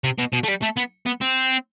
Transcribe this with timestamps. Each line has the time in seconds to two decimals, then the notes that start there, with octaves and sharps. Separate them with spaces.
0.04 C3
0.18 B2
0.33 B2
0.44 A3
0.48 G3
0.62 A3
0.77 B3
1.06 B3
1.21 C4